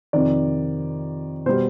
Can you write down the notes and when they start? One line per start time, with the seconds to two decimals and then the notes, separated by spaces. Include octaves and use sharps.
0.13 F2 C3 D#3 D5
1.46 B2 G3 C5